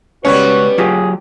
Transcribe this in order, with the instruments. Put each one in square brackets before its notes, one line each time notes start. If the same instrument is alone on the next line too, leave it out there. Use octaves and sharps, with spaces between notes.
[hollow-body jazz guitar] C#2 C#5 [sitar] G3 B3 C#4 [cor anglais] F#4 [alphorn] B4
[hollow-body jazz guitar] F#3 F4 G4 [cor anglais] G#4